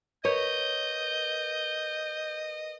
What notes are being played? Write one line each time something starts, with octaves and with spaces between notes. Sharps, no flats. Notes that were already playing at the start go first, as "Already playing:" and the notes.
A#4 B4 C#5 D#5 G6